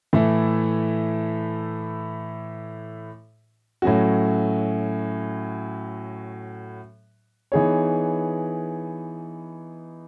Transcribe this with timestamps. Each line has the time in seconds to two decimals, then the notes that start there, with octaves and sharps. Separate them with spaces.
0.13 A2 E3 A3 E4 A4
3.82 A2 F#3 C#4 F#4
7.52 E3 B3 D#4 G#4 C#5